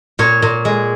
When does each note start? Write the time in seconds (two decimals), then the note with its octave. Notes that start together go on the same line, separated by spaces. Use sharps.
0.19 A#2 C#5
0.42 A#2
0.65 G#3